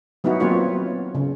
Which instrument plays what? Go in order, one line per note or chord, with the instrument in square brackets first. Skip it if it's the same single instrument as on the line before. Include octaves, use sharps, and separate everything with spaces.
[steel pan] F#3 B3 D#4 E4 F#4
F#3 A#3 C4 F4 B4 C#5
C#3